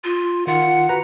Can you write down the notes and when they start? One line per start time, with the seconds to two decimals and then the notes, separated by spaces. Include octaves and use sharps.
0.04 F4
0.47 D#3 F4 F#5
0.89 F#4 B4 A#5